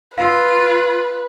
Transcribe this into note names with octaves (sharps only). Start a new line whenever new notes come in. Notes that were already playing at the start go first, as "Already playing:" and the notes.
F4 B4 F5 E6